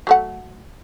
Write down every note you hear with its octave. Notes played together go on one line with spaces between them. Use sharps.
F#3 A3 F#5